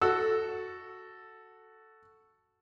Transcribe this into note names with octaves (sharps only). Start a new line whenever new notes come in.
F#4 A4 E6